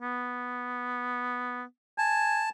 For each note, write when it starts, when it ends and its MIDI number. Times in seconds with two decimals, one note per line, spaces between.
0.02 1.64 59
1.98 2.48 80
1.98 2.49 81